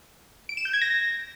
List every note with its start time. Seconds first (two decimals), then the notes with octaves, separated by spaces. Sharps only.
0.49 D7
0.57 E7
0.65 G6
0.73 G#6
0.81 A#6